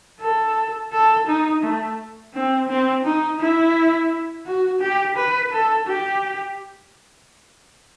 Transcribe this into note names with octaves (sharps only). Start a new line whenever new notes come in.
A4
A4
D#4
A3
C4
C4
D#4
E4
F#4
G4
B4
A4
G4